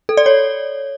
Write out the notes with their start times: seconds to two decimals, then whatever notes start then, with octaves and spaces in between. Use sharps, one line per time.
0.09 A4
0.17 D5
0.26 C#5